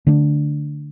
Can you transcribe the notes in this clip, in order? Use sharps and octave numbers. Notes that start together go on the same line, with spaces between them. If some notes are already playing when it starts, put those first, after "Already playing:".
D3 A3 D4